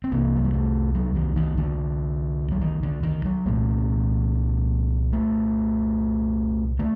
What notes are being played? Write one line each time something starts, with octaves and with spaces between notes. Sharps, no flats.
C4
C2 C3 A#3
F#3
G3
A3
F#3
D#3
D#3
D3
F#3
D#3
D3
D#3
F#3
C2 A#2 A3
A3
D3 A3